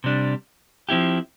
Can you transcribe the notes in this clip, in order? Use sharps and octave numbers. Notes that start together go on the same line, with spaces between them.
C3 G3 D4
F3 C4 E4 G4